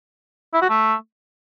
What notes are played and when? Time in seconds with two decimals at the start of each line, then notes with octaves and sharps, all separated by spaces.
0.54 E4
0.62 F#4
0.70 A3